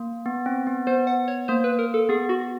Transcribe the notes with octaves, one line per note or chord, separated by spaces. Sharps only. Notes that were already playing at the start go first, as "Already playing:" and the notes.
Already playing: A#3
B3
C4
B3
B3 C5
F#5
C#5
A#3 C5
B4
A#4
A4
B3 G#4
F#4